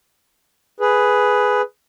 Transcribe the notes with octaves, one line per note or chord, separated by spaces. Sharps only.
G#4 B4